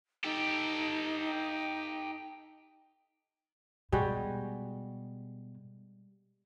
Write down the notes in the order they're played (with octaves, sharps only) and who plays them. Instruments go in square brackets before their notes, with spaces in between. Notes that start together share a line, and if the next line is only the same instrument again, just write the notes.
[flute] D#4 [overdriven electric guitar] G4 A4
[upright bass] B2 [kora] G3 G#3 F#4